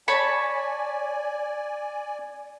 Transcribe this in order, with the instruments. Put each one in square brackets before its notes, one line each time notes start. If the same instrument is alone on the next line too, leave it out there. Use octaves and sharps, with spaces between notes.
[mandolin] C#5 A5 B5 [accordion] D5 G#5